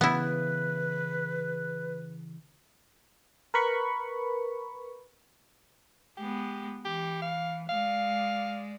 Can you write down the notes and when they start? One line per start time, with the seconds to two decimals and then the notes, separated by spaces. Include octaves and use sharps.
0.01 C#3 E3 B3 E4 B4
3.54 A#4 B4 B5 C#6
6.17 G#3 B3 G4
6.85 E3 G4
7.22 F5
7.69 G#3 D5 F5